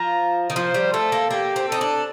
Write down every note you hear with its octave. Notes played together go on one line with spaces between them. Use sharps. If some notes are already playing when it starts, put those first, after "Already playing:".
Already playing: F3 A#5
D#3
F3 C5
G3
A3 A4
A#3
A#3 G4
C4
D#4 A4
D4